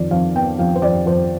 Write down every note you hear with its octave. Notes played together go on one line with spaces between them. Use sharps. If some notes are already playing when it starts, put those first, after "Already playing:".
Already playing: F2 D#3 D5
F2 F5
B3 G5
F2 F5
C5
F2 D5
F2 C5